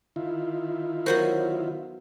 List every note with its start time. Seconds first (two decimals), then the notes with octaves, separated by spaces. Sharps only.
0.16 D#3 E4 F4
1.06 F#3 B3 F#4 A#4 C5 G6